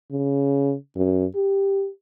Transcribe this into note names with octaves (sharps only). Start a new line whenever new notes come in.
C#3
F#2
G4